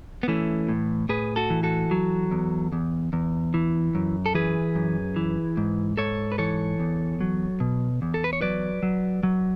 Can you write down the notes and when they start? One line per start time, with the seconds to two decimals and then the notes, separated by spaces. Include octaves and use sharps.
0.23 B3
0.28 E3 A3 C#4
0.69 A2
1.09 A2 G#4 B4
1.36 F#4 A4
1.50 E3
1.63 F#4 A4
1.91 F#3
2.32 E2
2.72 E2
3.13 E2
3.54 E3
3.95 F#2
4.26 A4
4.35 E3 G#4 B4
4.75 F#2
5.16 E3
5.57 G#2
5.97 G#2 A4 C#5
6.32 B4
6.38 E3 A4 C#5
6.79 E2
7.21 F#3
7.60 B2
8.02 E2
8.14 A4
8.24 B4
8.33 C#5
8.41 F#3 B4 D5
8.83 F#3
9.23 F#3